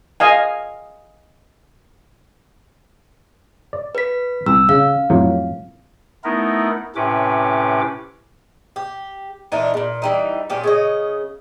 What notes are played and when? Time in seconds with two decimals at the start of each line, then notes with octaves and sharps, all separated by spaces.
0.20 D#5 F5 G#5
3.73 D5
3.95 B4 B6
4.46 C2 E6
4.69 C#3 F5
5.10 F2 A2 F#3
6.24 A3 B3 D#4 E4 A#4
6.95 A2 C3 C#4 B4 D6
8.76 G4
9.52 A#2 E3 D4 D#4
9.74 A#2 C#3
10.02 E3 G3 D#4
10.50 A#2 C#4 G4
10.64 C#3 C#5 D#5